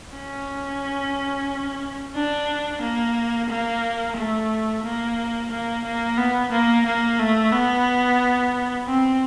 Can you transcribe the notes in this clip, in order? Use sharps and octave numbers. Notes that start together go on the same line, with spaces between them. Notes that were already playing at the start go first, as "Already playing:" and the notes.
C#4
D4
A#3
A#3
A3
A#3
A#3
A#3
B3
A#3
A#3
A3
B3
C4